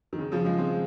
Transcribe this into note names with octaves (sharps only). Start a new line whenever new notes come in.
D#3
C#3
C#3 F3
F3 G#3
G#3 C4